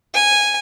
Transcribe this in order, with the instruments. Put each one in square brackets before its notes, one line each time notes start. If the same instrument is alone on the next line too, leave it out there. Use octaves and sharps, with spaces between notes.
[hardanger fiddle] G#5